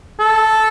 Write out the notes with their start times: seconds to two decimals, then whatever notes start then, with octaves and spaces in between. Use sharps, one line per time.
0.19 A4